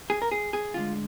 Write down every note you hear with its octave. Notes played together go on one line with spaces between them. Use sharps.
G#4
A#4
G#4
G#4
D2 D3 G#3 F4